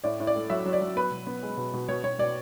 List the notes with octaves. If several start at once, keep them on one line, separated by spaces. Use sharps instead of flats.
A2 D5
A2
D5
A3
F#3 E5
F#3
D5
F#3
B3 B4
B2
B3
G#3
B2
B2
B2 C#5
B2 C#5
B2 D5